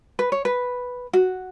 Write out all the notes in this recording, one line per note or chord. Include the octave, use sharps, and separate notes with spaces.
B4
C#5
B4
F#4